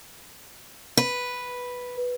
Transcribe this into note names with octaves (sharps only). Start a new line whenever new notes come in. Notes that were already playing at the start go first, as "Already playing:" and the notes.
B4